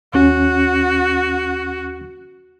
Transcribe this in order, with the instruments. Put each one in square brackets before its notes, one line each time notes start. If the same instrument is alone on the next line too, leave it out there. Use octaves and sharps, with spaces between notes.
[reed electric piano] D#2 C#4 [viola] F#4